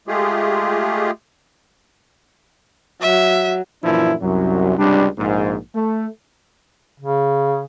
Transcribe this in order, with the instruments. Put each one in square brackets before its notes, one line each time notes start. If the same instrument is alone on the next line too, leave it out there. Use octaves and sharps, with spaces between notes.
[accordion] G#3 A3 F4 G4 G#4
[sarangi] F#3 [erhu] E5
[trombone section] F#2 A#2 E3 F3 D4 E4
C2 F#2 F#3
C#2 C3 G3 D4
A#1 G#2
A3
[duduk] C#3